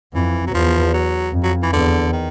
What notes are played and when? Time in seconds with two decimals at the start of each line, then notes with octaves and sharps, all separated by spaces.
0.14 F2 E3
0.47 F#3
0.53 E2 F3
0.94 F#3
1.33 F2
1.43 F#3
1.63 E3
1.73 E2 D3
2.12 D#3